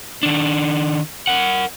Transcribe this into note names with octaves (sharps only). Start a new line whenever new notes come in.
D#3 D4
A#4 F#5